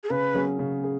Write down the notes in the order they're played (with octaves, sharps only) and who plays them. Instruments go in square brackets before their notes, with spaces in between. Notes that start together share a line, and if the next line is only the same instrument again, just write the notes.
[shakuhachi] G#4
[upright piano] C#3 [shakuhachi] B4
[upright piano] F#3 C#4 G#4
C#3
G#4